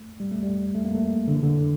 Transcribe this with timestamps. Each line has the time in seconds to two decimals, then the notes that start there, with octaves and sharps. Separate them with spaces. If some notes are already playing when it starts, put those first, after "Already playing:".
Already playing: A3
0.20 G3
0.31 A3
0.43 G3
0.74 A3
0.85 A#3
0.95 A3
1.28 D3
1.34 E3
1.42 D3